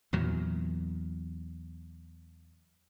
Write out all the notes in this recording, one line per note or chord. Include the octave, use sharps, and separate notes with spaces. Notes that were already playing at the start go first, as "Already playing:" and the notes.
E2 A#2 F#3